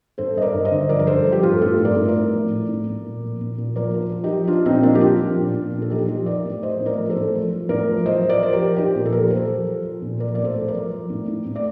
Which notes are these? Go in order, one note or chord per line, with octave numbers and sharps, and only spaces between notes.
G2 A4 C5
G2 D#5
A#4 D5
G2
C5 D#5
D3
F3 A#4 D5
A#4
G2 A4 C5
F3
G4
G2 F4 A4
A2 F4 A4
A2
A#4 D5
A2
A#4 D5
A2
F3
A2
A2
A2
A#2
F3
A#2
A#2
F3 A#4 D5
F3
F3
D#4 G4
F3
F3 D4 F4
A#2 C4 D#4
F3 A#3 D4
G4
F3 D4 F4
F3
A#2
A#2
A#2
A4
F3 D#4 G4
F3 D#4 G4
F3 A#4 D5
A2
F3 C5 D#5
A2
A#4 D5
F3
A4 C5
A2
F3
F3
A2 A#4 D5
F3
F3 C5 D#5
F3
A#4 D5
F3 C5
G4 A#4
F3
F3 D#4 G4
A#2
A4
F3 G4 A#4
F3 A4 C5
F3
F3
F3
A#2
F3 A#4 D5
A2 D5
A4 C5
A2
A#4 D5
F3
F3
A2
A2
A2
D5